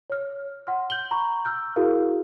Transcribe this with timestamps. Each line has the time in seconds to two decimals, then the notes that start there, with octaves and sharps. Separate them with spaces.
0.10 C#5 F6
0.67 F#5 C6 F6
0.90 G6 F#7 G7
1.11 A#5 B5 C#6
1.45 E6 F6 G6
1.76 E4 F#4 G#4 A#4 F5